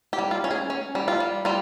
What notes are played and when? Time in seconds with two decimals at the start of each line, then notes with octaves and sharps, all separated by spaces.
0.13 G4
0.19 G3
0.31 F4
0.44 C#4
0.51 G#4
0.70 C#4
0.95 G3
1.08 F4
1.20 G3
1.45 G3 F4